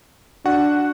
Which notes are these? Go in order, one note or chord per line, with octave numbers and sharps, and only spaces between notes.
D4 F#4 F#5